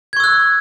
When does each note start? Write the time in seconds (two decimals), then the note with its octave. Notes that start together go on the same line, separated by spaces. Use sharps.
0.13 G#6
0.17 C#6
0.20 E6
0.24 F#6